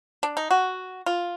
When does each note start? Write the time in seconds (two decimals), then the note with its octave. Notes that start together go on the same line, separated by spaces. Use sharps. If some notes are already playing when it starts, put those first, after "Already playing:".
0.23 D4
0.37 D#4
0.51 F#4
1.06 F4